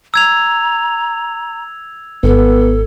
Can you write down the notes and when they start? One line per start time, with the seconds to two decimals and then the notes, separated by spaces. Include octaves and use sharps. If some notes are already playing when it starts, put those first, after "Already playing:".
0.14 A#5 E6 G#6 F7
2.23 G#1 B3 A4